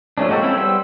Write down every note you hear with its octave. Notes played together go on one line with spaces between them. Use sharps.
F3 A3 C#4 D4
G#3 A#3 F#4 G4 A4
C4 C#4 E4 A4
G3 B3 G4 C5 E5